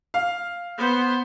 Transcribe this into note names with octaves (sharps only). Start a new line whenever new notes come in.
F5
B3 C5